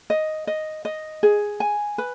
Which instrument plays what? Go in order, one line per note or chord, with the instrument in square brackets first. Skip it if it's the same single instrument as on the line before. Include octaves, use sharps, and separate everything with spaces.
[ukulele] D#5
D#5
D#5
G#4
G#5
B4